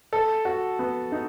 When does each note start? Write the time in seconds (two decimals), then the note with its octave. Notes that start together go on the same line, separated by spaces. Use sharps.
0.13 A4
0.45 F#4
0.79 B3
1.12 D#4